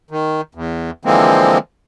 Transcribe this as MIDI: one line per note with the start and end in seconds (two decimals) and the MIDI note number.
0.11 0.41 51
0.55 0.91 40
1.05 1.58 50
1.05 1.58 52
1.05 1.58 53
1.05 1.58 56
1.05 1.58 58
1.05 1.58 60